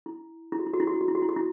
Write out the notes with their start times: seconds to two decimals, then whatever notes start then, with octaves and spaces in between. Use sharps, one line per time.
0.06 E4
0.52 E4
0.59 F#4
0.66 E4
0.74 F#4
0.80 E4
0.87 F#4
0.94 E4
1.01 F#4
1.08 E4
1.15 F#4
1.22 E4
1.29 F#4
1.36 E4